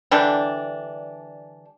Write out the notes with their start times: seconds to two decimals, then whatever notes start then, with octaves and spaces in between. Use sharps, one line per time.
0.11 D3 E3 G3 D4